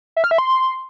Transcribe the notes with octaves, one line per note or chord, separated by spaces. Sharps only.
E5
F6
E5
C6